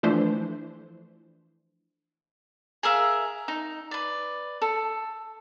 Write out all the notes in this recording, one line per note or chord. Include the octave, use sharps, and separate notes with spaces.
E3 F3 A3 D4 C5
G#4 A#4 E5 F5
D#4
B4 D5
A4